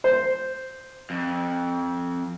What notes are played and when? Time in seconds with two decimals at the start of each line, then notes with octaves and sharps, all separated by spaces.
0.04 C5
1.10 F2